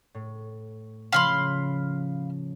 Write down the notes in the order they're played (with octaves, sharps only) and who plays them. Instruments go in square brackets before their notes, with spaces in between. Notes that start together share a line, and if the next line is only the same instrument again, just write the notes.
[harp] A2
[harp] C#3 F3 [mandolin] F5 B5 C6